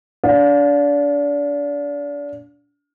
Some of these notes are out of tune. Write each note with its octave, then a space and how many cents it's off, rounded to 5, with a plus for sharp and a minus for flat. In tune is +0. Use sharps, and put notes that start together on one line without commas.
D4 -30 F5 +30